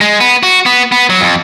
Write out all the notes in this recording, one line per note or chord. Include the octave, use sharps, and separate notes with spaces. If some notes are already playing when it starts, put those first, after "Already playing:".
G#3
B3
F#4
B3
B3
F#3
F2